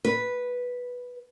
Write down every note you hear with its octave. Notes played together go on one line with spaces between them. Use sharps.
B4